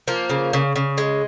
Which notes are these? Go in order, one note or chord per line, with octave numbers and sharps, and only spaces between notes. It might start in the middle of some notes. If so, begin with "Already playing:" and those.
F3 A#3
C#3
C#3
C#3
G#3